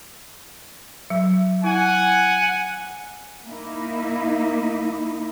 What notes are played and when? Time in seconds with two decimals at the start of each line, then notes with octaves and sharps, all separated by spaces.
1.10 F#3
1.64 E4 F#5 G#5
3.46 A#3 D#4 E4